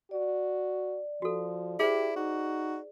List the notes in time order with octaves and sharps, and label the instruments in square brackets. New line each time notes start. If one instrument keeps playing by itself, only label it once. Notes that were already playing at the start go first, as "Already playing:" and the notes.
[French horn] F#4 [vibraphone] D5
[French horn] F3 [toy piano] F#4 A4
[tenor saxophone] E4 [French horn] G4 [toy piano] G#4 C5
[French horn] D#4 [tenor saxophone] F#4